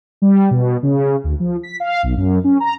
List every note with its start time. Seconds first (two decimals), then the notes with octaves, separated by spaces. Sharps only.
0.22 G3
0.51 B2
0.83 C#3
1.24 D2
1.40 F3
1.63 B6
1.80 F5
2.03 B1
2.17 F#2
2.44 C#4
2.60 A#5